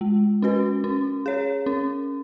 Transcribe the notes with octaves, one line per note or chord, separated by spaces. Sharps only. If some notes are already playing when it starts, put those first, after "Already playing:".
G#3
C#4 F#4 B4
C#4
G#4 C#5
C#4